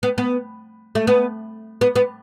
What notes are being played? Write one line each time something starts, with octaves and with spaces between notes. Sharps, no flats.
B3
B3
A3
B3
B3
B3